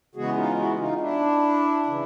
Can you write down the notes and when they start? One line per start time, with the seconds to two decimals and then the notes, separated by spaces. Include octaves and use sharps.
0.15 C#3 E3 G#3 B3 F#4 G#4
0.36 D#4 F4
0.58 E4 F#4
0.79 D#4 F4
1.00 D4 E4
1.86 C#3 E3